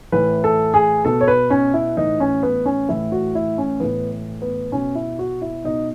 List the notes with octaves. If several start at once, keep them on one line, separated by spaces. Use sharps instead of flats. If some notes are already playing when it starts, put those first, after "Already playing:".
A2 E3 B4
A4
G#4
B2 A4
C#5
B4
C#4
E4
A2 E3 D#4
C#4
B3
C#4
A2 E3 E4
F#4
E4
C#4
A2 E3 B3
B3
B2 C#4
E4
F#4
E4
B2 D#4